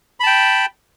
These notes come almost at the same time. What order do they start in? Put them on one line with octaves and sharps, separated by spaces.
B5 A5 G5